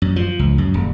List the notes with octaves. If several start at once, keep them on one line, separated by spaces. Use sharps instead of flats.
F#2
F3
C#2
F#2
D#1